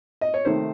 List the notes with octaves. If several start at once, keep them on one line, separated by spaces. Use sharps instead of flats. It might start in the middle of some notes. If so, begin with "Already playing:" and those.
D#5
C#5
C3 D#3 A3 C5